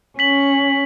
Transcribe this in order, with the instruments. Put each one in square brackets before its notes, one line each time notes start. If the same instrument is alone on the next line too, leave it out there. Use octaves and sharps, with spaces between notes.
[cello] C#4 [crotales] B6 F#7